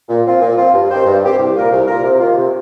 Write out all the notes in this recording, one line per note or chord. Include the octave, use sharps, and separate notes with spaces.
A#2
F3 C4 F4
A#2
F3 C4 F4
G2
D#3 C4 G4 C5
G2
D#3 C4 G4 C5
C2
A#2 A#3 F4 A#4
C2
A#2 A#3 F4 A#4
C3
D#3 A#3 F4
C3